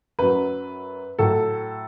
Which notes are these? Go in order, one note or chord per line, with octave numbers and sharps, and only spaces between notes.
F#2 F#3 B4
A2 F#3 A4